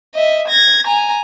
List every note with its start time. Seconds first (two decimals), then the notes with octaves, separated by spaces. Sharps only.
0.15 D#5 E5
0.48 G#6 A#6
0.87 G#5 A#5